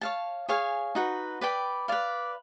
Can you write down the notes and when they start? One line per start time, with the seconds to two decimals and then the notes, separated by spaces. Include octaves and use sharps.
0.01 C#5 F5 A5
0.49 G#4 C#5 F5 G#5
0.95 D#4 F#4 B4
1.41 B4 D5 G5 B5
1.88 B4 D5 F5